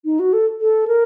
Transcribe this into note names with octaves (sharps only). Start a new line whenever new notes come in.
D#4
F#4
A4
A4
A#4